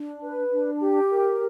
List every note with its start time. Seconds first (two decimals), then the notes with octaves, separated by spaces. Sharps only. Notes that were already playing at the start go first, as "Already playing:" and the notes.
Already playing: D4
0.22 B4
0.51 D4
0.80 G4
1.09 A#4